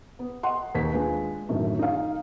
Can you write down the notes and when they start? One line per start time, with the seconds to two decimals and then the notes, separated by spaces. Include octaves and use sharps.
0.19 B3
0.43 D#5 F#5 C6
0.75 D#2 B6
0.92 G#3 D4 F4 G#4 B4
1.49 F#2 A2 D3 D#3
1.79 D#4 F5